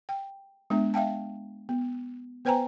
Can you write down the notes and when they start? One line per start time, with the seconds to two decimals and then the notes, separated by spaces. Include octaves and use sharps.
0.09 G5
0.70 G#3 B3 D4 E5
0.94 E5 F5 G5 A5
1.69 B3
2.45 B3 B4 C5 G5 G#5 A#5